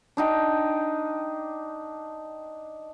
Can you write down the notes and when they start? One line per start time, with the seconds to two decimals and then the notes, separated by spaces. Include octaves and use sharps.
0.17 D4 D#4 G5